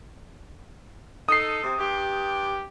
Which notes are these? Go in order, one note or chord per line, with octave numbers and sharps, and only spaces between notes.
D#4 A4 D#6 C7
C3
G2 G4